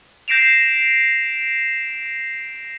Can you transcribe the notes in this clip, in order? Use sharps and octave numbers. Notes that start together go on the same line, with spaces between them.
G6 A#6 C7 D7 E7 F7